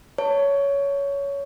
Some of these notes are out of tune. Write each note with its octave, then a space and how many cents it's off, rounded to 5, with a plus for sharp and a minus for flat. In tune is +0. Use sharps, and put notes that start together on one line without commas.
C#5 +15 A5 +25